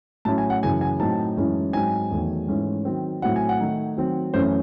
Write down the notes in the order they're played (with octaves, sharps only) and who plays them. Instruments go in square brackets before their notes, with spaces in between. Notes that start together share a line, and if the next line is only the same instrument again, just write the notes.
[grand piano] A2 F#3 C#4 E4 A5
G#5
F#5
F#2 C#3 E3 G#5
G#5
A2 F#3 C4 D#4 A5
F#2 E3 G#3 C#4 E4
G#2 F#3 C4 D#4 G#5
E2 D#3 F#3 A3
G#2 E3 A3 C#4
D#3 F#3 C4
A2 F#3 C4 E4 F#5
G#5
F#5
D#3 A3 D#4
D#3 F#3 C4
F#2 E3 A3 C#4 E4 C5